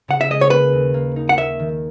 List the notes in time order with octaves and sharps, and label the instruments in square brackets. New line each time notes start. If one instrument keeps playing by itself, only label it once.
[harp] C#3 [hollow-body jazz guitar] F#5
[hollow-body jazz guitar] E5
[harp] G#3 [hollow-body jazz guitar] D#5
[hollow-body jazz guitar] C#5
[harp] A#3 [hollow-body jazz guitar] B4
[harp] D#2
A#3
D#4
[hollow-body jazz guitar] F#5
[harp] A#3 [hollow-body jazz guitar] E5
[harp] D#3